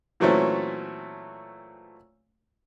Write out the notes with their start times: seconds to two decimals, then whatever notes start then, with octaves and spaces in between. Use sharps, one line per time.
0.20 A#2 E3 F#3 A3 C4 C#4